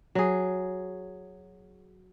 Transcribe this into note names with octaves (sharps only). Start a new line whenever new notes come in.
F#3 G#4